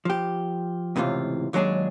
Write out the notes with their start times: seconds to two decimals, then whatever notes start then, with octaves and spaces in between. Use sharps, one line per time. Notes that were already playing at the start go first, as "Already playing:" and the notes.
0.05 F3 G4
0.96 C#2 A2 C3 E3 F4
1.53 D#2 F#3 G#3 D4 G#4